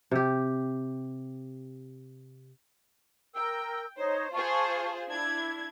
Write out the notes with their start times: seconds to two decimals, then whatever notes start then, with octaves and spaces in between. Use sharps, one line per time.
0.11 C3 G4
3.35 A#4 G5 E6
3.97 D#4 C5 C#5
4.34 F4 G#4 C5 F5 A5 C#6
5.10 D4 E4 G#6